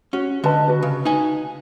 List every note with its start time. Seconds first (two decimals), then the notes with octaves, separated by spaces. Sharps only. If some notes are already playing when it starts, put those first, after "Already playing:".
0.13 C#4 F#4
0.44 D3 B4 D#5 A5
0.68 F#4 B4
0.83 C#3
1.05 D#4 G#5